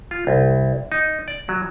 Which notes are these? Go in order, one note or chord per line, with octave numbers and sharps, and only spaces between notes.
F4
C2
D#4
D5
F#3